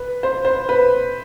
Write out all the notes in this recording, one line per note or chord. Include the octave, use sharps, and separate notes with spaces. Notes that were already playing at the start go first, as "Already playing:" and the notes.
Already playing: B4
C5
C5
B4